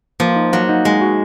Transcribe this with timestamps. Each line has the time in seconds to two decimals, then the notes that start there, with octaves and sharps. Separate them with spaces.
0.20 F3 A#3
0.36 D#4
0.53 F#3 A#3
0.69 D#4
0.85 G#3 D#4
1.01 F#4